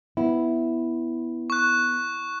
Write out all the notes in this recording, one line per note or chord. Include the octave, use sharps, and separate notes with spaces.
B3 E4
C#6 F#6